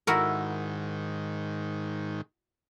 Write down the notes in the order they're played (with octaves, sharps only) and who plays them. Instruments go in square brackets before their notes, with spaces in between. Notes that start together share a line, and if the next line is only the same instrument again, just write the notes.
[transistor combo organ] G#2 D#3 [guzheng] E4 F#4 A#4